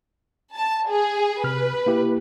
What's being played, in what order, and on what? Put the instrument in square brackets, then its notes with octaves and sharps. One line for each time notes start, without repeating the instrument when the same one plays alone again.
[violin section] A5
G#4
[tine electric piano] C3 F6 [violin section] B4
[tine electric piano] A#3 E4 G4